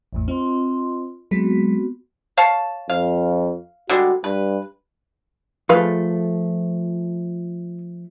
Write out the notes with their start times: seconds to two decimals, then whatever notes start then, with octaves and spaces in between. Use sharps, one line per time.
0.13 A1 E2 A2
0.28 C4 F4 D#5 C6
1.31 F#3 G#3 B3 C4 F#4 B6
2.37 C#5 F5 A5
2.89 F2 F5
3.89 D3 G3 G#3 F#4
4.24 G2 B4
5.69 F3 A3 G#4 B4 F5